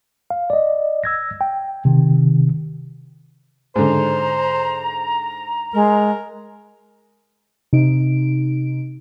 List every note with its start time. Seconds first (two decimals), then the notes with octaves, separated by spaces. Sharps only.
0.30 F5
0.50 D5 D#5
1.04 E6 G#6 A#6
1.41 G5
1.85 C3 D#3
3.76 G#2 D3 C5 A#5
5.74 G#3 A#4
7.73 C3 D#4 D7